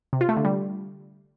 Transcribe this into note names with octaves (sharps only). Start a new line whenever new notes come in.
C3
F4
A3
D3
G3